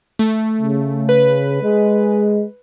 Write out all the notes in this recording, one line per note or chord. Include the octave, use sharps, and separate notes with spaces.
A3
C#3
B4
G#3